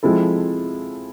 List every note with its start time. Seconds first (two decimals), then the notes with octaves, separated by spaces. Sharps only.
0.03 F3 G#3 C4 E4 A4